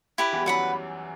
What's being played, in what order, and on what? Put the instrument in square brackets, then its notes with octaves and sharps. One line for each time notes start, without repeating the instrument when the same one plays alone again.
[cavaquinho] E4 G4 B4
[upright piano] E2 E3
G3
[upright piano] F#2 F#3 [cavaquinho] B4 F#5 B5